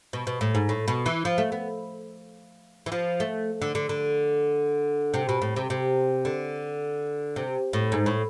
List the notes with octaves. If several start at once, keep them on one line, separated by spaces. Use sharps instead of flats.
B2
B2
A2
G#2
A2
B2
E3
F3
A3
B3
E3
F3
A3
D3
D3
D3
C3
B2
A2
C3
C3
D3
C3
A2
G#2
A2